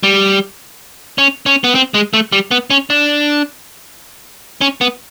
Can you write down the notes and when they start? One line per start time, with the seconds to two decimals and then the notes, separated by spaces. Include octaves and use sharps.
0.03 G3
1.18 C#4
1.46 C#4
1.64 B3
1.75 C4
1.94 G#3
2.13 A3
2.32 G3
2.51 B3
2.70 C#4
2.90 D4
4.61 C#4
4.81 B3